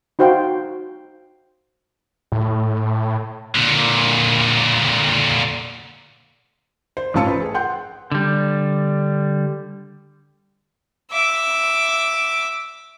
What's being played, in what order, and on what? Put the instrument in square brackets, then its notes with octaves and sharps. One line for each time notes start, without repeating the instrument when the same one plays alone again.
[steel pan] D#4 F#4 C5 F5 G5
[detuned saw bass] A2
[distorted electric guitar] A#2 D3
[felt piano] C5
A1 C#4 F4 A5 E6 C#7
B4 C5
G#4
F#5 G5 C6 G6
[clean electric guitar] D3 G3
[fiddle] E5 D6